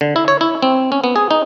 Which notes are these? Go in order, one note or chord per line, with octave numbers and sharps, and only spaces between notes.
D3
E4
C#5
E4
C4
C#4
B3
G#4
D#4